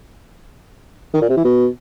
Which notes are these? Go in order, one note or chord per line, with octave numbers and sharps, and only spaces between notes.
D#3
A#2
C3
E3
B2